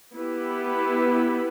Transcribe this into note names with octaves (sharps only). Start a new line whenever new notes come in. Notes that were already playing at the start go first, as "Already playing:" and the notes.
B3 E4 G4 B4